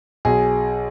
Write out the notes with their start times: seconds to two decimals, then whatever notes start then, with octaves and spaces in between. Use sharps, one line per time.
0.25 B1 G#4